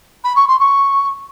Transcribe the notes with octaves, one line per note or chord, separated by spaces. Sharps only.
B5
C#6
C6
C#6